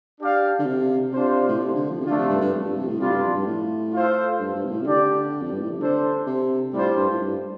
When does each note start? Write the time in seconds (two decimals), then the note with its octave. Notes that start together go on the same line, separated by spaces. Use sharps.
0.19 D4 G4 D5 F5
0.59 D3
0.66 C3
1.13 C3 D4 F4 C5
1.49 A2
1.59 C3
1.75 D3
1.90 F3
2.01 C3
2.05 D3 A3 D4 F4
2.18 C3
2.29 G2
2.41 G2
2.53 F2
2.65 G2
2.76 C3
2.88 A2
2.99 C3 G3 D4 F4
3.11 G2
3.23 F2
3.34 G2
3.46 A2
3.93 F4 A4 C5 F5
4.39 G2
4.55 G2
4.64 C3
4.71 A2
4.82 C3
4.86 D3 D4 G4 D5
5.42 F2
5.52 G2
5.61 A2
5.70 C3
5.80 D3 D4 A4 C5
6.26 C3
6.73 A2 G3 D4 F4 C5
6.96 G2
7.10 A2
7.20 G2